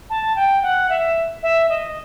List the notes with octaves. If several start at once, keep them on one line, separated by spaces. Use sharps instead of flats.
A5
G5
F#5
E5
E5
D#5